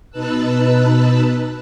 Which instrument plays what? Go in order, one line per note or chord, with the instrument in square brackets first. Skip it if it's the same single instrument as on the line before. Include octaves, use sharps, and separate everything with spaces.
[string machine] B2 D#4 B4 A5 E6 F#6